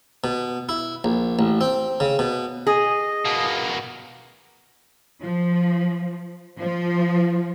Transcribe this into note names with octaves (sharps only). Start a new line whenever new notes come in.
B2
E4
A#1
A1
C4
C#3
B2
G#4 D#5
B2 A#3
F3
F3